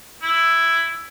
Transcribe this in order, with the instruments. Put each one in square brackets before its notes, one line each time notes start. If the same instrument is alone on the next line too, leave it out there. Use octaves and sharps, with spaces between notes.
[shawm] E4